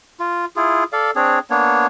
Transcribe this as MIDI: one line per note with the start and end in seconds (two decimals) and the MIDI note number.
0.20 0.45 65
0.56 0.84 64
0.56 0.84 65
0.56 0.84 68
0.93 1.11 69
0.93 1.11 74
0.93 1.11 77
1.16 1.39 60
1.16 1.39 62
1.16 1.39 68
1.16 1.39 73
1.50 1.87 58
1.50 1.87 59
1.50 1.87 62
1.50 1.87 73